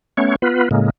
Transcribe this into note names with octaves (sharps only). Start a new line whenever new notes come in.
A3 B3 C#4 C#5
B3 F4 B4
A2 C#3 G#3 A#3